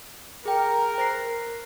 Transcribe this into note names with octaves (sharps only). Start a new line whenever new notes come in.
G#4 A#4 G5
C5 A#6 C7